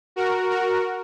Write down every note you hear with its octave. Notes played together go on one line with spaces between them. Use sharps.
F#4 A#4
F#4 A#4